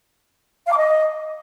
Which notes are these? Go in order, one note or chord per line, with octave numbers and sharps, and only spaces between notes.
F5
D6
D#5